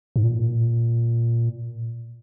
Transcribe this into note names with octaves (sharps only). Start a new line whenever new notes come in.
G#2
A#2